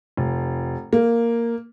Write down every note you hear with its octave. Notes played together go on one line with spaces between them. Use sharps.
F1
A#3